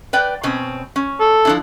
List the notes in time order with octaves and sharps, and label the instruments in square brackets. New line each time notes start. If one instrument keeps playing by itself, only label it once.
[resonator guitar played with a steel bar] B4 D5 G5
B2 C4 C#4
C#4
[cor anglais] A4
[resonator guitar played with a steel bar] F3 D4 E4